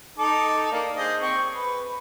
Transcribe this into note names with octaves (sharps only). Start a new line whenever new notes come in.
D#4 A4 D6
A#3 D4
G#4 C5 D#5
C4 C#6
B4